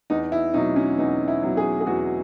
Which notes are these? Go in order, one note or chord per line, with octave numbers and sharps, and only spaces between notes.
E2 D#4
E4
B2 F#3 D#4
C#4
E2 D#4
E4
B2 F#3
G#4
G#4
E2 F#4